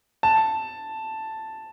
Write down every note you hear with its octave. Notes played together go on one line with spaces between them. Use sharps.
A5